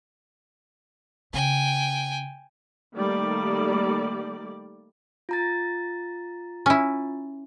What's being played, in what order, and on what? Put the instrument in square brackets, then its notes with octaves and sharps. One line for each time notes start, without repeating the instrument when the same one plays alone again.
[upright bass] C#3 [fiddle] G5 G#5
[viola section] D#3 G3 A3 A#3 D5
[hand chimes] F4 A#5 A6
[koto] C#4 E4